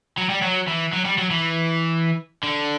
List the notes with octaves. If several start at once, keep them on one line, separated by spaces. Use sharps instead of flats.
F#3
G3
F#3
E3
F#3
G3
F#3
E3
D3